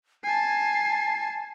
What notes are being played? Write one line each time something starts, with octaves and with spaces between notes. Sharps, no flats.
G#5 A5 C7